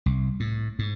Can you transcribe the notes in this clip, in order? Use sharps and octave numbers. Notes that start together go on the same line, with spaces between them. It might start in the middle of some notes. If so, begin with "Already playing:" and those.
C2
A2
G#2